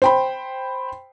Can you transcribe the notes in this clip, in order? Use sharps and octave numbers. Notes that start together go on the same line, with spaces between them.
C5 G5 B5